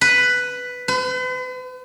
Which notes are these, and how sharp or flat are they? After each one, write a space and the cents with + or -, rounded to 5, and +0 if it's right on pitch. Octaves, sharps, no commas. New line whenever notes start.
B4 +5
B4 +45